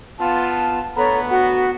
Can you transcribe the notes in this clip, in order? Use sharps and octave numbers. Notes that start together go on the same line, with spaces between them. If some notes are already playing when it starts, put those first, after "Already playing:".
B3 F4 A5
D2 B3 A4 C#5 A#5 B5
F#4 F#5